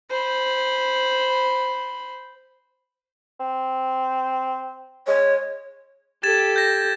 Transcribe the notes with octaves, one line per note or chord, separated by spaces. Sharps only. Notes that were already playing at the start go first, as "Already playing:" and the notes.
C5 B5
C4
G#3 C#5
G4 A4 G#6 A6 E7
G6 A#6